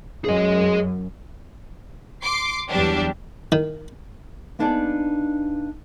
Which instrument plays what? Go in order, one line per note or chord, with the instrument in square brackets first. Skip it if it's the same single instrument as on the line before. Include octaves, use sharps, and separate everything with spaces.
[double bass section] F#2 [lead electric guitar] G#4 D#5
[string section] C6 D6 C7
E2 F#3 G3 D4 G4
[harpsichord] D#3
[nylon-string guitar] A#3 B3 D4 D#4 G#4 D5